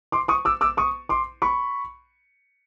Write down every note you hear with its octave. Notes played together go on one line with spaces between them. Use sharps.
C6 D6
C#6 D#6
D6 E6
D6 E6
C#6 D#6
C6 D6
B5 C#6